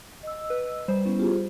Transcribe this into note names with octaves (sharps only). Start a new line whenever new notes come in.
D#5 E6
B4
G3 C5
B3 C#4 E4
F4 G4 G#4